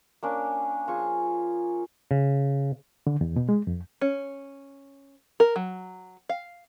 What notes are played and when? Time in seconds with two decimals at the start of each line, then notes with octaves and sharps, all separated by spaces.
0.23 A#3 C#4 D4
0.87 F3 F4 G#4 C#6
2.11 C#3
3.07 D3
3.21 E2
3.36 B2
3.49 G#3
3.67 F2
4.01 C#4
5.40 A#4
5.56 F#3
6.29 F5